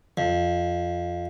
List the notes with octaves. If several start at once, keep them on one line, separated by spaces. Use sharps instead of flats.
F2